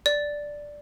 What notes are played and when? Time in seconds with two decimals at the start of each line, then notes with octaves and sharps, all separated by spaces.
0.06 D5